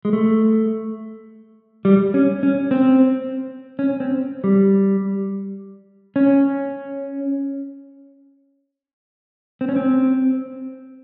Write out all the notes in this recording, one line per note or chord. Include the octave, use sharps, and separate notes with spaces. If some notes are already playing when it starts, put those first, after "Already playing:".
G#3
A3
G3
C#4
C#4
C4
C#4
C4
G3
C#4
C4
C#4
C4